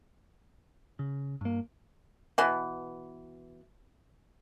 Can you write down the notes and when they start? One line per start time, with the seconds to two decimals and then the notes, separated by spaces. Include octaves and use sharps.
0.99 C#3
1.41 G2 A#3
2.38 B2 E3